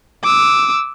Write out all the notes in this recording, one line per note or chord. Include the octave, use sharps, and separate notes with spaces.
D6 E6